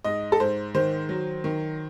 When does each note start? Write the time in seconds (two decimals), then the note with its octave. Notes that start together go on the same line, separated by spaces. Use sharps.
0.04 G#2 D#5
0.32 A4
0.40 G#2 C5
0.75 D#3 C5
1.09 F#3
1.44 D#3